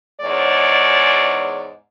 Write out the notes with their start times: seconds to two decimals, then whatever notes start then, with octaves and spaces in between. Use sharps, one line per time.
0.21 E2 G#2 G#3 C#5 D5